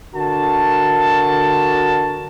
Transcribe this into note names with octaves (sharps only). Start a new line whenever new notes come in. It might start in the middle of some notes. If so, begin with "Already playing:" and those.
D3 F#4 A#4 A5